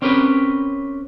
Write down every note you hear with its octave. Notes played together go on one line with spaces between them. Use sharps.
C4 C#4 G4 A#4 B4